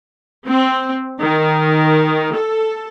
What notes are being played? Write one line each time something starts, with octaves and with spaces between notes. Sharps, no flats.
C4
D#3
A4